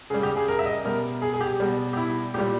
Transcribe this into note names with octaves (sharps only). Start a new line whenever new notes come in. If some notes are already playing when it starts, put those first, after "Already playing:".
C#3 G3 G#4
G4
G#4
A#4
E5
D#5
B2 G3 A#4
G#4
G#4
G4
B2 G3
G4
E4
A#2 G3 G4